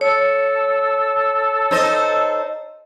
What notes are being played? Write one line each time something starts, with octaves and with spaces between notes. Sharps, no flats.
A4 C#5
D#4 C5 D#5